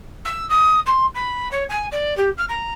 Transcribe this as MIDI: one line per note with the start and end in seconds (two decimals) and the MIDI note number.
0.24 0.46 88
0.49 0.79 87
0.86 1.05 84
1.14 1.48 83
1.51 1.63 73
1.69 1.86 80
1.91 2.16 74
2.17 2.29 67
2.37 2.44 89
2.48 2.73 82